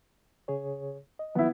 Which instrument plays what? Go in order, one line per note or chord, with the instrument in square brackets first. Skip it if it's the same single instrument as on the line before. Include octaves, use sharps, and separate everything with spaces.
[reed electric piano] C#3 G#4 C#5
D#5
[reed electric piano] D#3 F3 F#3 [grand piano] B3 E4